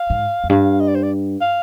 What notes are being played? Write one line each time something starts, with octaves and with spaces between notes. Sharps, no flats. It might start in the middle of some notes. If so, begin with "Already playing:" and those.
Already playing: F5
G#2
F2
G2 F5
D#5
D5
C5
D5
F5